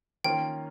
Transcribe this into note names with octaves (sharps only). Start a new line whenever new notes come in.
D#3 A#3 C#4 F4 G5